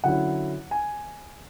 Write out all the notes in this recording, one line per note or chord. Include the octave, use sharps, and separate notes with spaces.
D3 F#3 C#4 E4 F#5
G#5